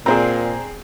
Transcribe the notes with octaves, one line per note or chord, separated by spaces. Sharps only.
A#2 C4 G#4 C5 D5 A#5